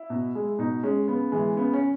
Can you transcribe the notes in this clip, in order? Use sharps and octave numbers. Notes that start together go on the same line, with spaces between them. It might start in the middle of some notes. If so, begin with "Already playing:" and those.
Already playing: E4
B2
G#3
B2 D#4
G#3 C#4
C#3 B3
E3 G#3
C#3 B3
C#4